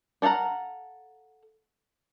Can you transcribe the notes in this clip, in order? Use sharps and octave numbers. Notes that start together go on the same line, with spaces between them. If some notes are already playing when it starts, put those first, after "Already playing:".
D4 A4 F5 F#5 A#5